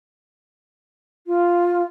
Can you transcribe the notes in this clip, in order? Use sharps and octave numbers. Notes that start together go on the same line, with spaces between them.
F4